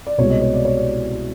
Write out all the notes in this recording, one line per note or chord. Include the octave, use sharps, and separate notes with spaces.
D5
C2 B2 G#3 C#5
D#5
C#5
D5
C#5
D5